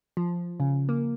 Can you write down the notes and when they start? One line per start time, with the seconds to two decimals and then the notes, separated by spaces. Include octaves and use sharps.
0.17 F3
0.60 C#3
0.89 A#3